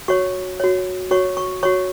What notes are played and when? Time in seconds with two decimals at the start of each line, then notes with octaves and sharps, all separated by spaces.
0.08 F#4 C#5 C#6
0.60 F#4 C#5
1.11 F#4 C#5 C#6
1.37 C#6
1.63 F#4 C#5 C#6